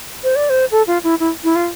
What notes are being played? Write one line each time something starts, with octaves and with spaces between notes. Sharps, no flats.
C5
D5
C5
A4
F4
E4
E4
E4
F4